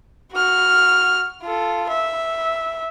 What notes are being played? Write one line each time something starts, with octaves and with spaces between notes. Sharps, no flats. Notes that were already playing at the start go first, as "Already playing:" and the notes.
F#4 F6
F4 A4
E5